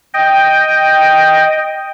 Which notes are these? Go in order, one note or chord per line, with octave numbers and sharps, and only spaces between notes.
D#5 G5